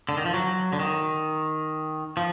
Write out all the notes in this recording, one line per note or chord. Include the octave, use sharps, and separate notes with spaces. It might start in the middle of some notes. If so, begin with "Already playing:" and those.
D3
D#3
F3
F#3
D3
D#3
F3